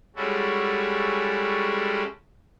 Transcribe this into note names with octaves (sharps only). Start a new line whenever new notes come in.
G3 G#3 C#4 E4 F#4 A4